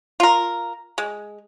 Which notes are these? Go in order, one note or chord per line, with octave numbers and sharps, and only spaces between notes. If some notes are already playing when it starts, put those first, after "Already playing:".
F4 A#4
G#3